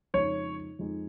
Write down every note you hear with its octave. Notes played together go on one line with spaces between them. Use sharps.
F2 C#3 G#3 D#4 C#5
F2 F3 G#3 D#4